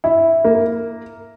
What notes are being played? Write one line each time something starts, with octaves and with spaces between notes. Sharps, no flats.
E4
A#3